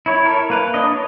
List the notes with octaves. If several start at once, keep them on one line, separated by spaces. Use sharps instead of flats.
E4 C#5
E4 A4 A#4 C#5
A#3 B4 F5
D4 D#5
C#5